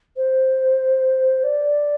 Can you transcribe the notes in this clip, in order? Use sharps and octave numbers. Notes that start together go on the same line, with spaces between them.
C5
D5